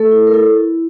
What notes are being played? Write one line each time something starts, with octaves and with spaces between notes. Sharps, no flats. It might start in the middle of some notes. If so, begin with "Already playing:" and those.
Already playing: A3 A4
E4
A#4
E4 A4